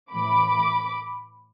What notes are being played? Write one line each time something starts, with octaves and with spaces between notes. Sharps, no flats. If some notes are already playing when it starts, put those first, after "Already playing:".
A2 E3 B5 D6